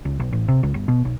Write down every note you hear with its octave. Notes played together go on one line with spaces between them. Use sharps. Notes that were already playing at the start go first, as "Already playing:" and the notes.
C#2
B1
A1
C3
C#2
G1
B2
B1